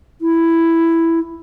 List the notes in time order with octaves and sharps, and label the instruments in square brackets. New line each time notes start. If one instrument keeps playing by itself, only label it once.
[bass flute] E4